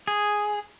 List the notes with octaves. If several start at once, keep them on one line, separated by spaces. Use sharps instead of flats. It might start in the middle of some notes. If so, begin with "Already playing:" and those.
G#4